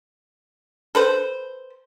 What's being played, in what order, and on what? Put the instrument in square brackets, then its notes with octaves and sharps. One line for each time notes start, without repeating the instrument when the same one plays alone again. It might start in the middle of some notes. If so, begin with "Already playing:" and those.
[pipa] A4 B4 C5